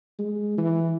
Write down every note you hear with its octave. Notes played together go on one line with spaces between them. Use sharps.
G#3
E3